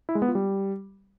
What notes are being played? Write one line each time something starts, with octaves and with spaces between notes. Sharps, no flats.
E4
G#3
B3
F4
G3